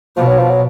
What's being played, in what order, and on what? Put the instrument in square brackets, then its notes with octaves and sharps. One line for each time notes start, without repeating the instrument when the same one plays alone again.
[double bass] B2 [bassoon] F3
[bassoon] F#3
F3
F#3